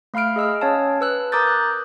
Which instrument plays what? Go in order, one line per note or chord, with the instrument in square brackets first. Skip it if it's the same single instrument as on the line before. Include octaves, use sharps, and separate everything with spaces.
[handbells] A3 F5 B5 F6 D7
G#4 D#5 E6 F6
C#4 C#5 F5 A5
B4 E6 F#6
A#4 A#5 D6 D#6 G6 A6
F#6